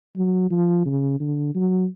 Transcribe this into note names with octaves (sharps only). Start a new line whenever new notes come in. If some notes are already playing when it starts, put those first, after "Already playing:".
F#3
F3
C#3
D3
F#3